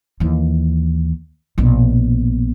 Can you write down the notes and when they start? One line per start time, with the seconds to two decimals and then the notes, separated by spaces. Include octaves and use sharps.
0.20 D#2 E3
1.58 A#1 B2